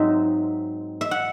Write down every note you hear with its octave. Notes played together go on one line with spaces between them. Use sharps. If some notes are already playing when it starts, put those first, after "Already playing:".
Already playing: G#2 F#3 C4 D#4 E5
E5
F#5